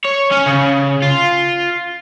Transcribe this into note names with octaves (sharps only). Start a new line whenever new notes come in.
C#5
C#4
C#3
F4